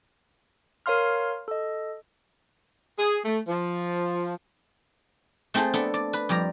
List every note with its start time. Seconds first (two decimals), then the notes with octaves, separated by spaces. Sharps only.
0.86 A#4 C#5 F5 C6 F6
1.48 A4 D#5
2.98 G#4
3.25 A3
3.48 F3
5.54 A3 C4 G#4 A4 C5
5.74 B3 D4 A4
5.94 D5
6.13 B4
6.29 F2 G3 D5 A#5